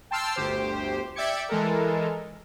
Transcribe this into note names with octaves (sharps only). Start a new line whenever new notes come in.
G5 A5 C6 E6 F6
G1 D2 G4 C5
D5 E5 G5 D6 G#6 C#7
E3 G#3 A4 A#4